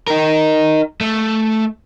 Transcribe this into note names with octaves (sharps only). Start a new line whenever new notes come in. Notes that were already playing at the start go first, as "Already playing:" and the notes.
D#4 A#4
A3